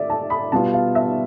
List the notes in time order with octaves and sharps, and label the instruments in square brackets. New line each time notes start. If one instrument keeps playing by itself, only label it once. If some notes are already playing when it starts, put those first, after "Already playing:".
Already playing: [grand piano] A3 [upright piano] D5 E5
[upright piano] A5
B5
[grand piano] B2 G3 B3 F4 [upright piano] A5
[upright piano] F5
E5